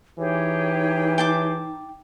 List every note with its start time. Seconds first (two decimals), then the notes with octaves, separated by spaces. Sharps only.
0.18 E3 D#4 G4 G#4 C#5
1.18 G5 A5 D6